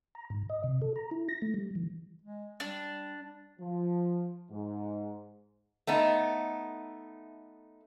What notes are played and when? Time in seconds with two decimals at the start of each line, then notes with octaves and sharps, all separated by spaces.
0.15 A#5
0.30 G#2
0.50 D#5
0.64 C3
0.82 A4
0.96 A#5
1.11 E4
1.29 A#6
1.42 A3
1.54 G3
1.75 E3
2.22 G#3
2.60 G3 D4
3.60 F3
4.51 G#2
5.87 A3 B3 D#4